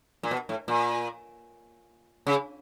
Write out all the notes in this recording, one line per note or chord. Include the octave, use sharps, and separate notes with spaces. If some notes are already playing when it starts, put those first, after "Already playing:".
A#2
B2
A2
A#2
C#3